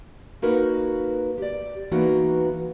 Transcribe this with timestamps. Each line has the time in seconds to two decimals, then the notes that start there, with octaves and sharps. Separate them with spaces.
0.42 A#3 D#4 F#4 A#4 B4
1.38 G4 D5
1.91 E3 A#3 B3 D#4 F#4